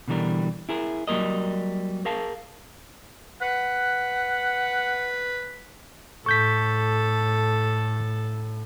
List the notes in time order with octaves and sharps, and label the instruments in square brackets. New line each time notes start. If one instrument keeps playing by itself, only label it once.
[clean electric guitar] B2 D3 E3 G3 A#4
E4 G#4 A#4
F#3 G3 A#3 A#4 D#5
G#4 A#4 F5 A5
[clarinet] B4 [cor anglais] F#5
[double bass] A2 [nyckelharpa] A4 [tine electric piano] C#6 G6 B6